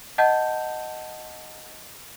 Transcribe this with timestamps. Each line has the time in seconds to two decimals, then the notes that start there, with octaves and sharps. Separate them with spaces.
0.18 D#5 F#5 A5 G6